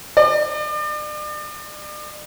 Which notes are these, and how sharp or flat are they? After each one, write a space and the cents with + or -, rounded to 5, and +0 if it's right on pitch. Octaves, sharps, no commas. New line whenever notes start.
D5 +40